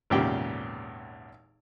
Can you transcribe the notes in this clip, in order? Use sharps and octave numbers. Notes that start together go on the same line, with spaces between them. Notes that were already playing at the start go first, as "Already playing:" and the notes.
G#1 E2 A#2 C#3 G4 G5